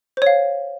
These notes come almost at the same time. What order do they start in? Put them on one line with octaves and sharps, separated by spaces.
C5 C#5 F5